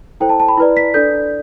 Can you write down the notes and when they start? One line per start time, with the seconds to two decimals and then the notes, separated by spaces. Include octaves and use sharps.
0.20 E4 A4 C5 G5
0.29 A5
0.40 A5
0.48 B5
0.57 E4 B4 D5
0.77 B6
0.94 D4 A4 D5 G6